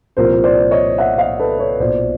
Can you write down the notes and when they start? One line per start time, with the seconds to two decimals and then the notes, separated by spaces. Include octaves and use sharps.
0.17 C2 A#2 F3 A#4 C5
0.44 C5 D5
0.71 C#5 D#5
0.98 E5 F#5
1.18 D#5 F5
1.39 A4 B4
1.59 B4 C#5
1.80 B1 A#2 F#3 C5 D5